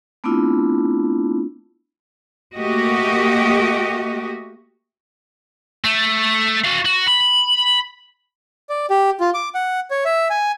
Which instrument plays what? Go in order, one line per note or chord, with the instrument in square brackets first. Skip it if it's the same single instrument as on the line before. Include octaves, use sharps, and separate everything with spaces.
[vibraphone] A3 B3 C4 D4 E4 F4
[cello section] A3 A#3 F#4 G4 D#5
[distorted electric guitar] A3
F#4 F5
F#4
B5
[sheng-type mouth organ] D5
G4
F4
D6
F#5
C#5
E5
G#5